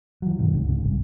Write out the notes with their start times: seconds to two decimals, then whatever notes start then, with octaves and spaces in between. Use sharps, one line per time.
0.22 E3 F#3
0.38 G2 B2 D#3 F#3
0.52 F1 C#2 D3
0.68 F1 G#2 C#3
0.82 G1 C2